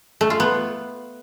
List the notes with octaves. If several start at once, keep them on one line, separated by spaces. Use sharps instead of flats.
A3
F4
B3